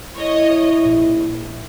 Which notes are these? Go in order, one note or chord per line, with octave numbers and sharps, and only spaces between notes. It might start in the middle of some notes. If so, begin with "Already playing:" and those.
E4 C#5 D#5
A#1